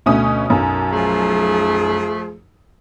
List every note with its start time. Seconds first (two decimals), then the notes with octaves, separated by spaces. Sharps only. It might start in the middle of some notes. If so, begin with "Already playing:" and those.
0.06 D2 B2 C#4 D#6
0.50 B1 F#2
0.93 F3 A3 G#4